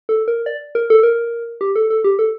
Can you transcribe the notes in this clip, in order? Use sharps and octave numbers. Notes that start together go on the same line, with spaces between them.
A4
A#4
D5
A#4
A4
A#4
G4
A4
A4
G4
A4